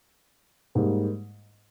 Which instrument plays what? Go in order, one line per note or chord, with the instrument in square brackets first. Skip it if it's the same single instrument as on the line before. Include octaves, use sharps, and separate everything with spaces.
[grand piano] G#2 G3 A#3 D#4